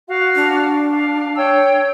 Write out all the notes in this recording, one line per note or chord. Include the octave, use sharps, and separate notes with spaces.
F#4 F5
D4
F5
C#5 G5 E6